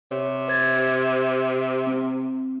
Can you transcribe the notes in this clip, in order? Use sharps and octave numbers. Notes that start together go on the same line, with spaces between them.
C3 C#5
C5 G#6 A6
C4